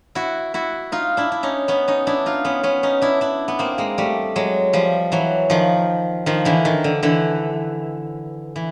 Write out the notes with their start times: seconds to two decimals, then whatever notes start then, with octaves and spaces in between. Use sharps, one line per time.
0.15 E4 F#4
0.54 E4 F#4
0.92 D#4 F4
1.17 D4 E4
1.32 E4
1.43 C#4 D#4
1.68 B3 C#4
1.88 C#4 D#4
2.07 D4 E4
2.26 D#4 F4
2.45 B3 C#4
2.63 B3 C#4
2.83 C#4 D#4
3.02 D4 E4
3.21 D4 E4
3.48 B3
3.59 A#3 C4
3.78 G#3 A#3
3.98 G3 A3
4.36 F#3 G#3
4.73 F3 G3
5.12 E3 F#3
5.50 D#3 F3
6.26 D#3 F3
6.45 D3 E3
6.65 D#3
6.84 D3
7.03 D3 E3
8.56 E3